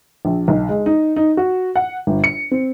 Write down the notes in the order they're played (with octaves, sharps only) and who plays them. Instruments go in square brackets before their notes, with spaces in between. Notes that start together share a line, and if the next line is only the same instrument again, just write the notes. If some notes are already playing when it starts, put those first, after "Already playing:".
[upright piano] A#1
B1
G#3
D#4
D#4
F#4
F#5
G1
C#7
C4